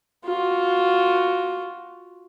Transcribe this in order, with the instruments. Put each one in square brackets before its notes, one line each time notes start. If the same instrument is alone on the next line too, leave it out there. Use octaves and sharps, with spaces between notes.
[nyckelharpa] F4 F#4